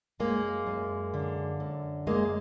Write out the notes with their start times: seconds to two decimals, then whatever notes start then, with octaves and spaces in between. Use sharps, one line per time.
0.20 F#2 G#3 A#3
0.67 F#2
1.14 D3
1.60 F#2
2.07 F#2 G#3 A#3